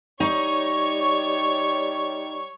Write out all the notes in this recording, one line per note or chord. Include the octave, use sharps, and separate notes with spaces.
G3 D#4 C#5 C#6